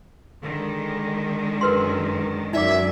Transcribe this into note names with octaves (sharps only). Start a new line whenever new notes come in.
D3 D#3 G#3
F#2 A#4 B4 C6
F#2 F#3 D#4 D5 E5 D6